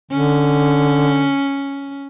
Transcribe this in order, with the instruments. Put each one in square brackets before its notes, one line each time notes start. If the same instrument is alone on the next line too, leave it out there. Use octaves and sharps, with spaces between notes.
[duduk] D3 [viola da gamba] C#4